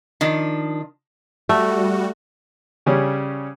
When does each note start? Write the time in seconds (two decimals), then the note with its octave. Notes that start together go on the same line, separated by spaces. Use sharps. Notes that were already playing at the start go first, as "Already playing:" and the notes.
0.21 D#3 F3 D4
1.49 G3 A3 F#4
2.86 C#3 G3 C#4